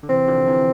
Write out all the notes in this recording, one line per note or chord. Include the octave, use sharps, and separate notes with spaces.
D3
C3 E3 C4
D3 F3
C3 E3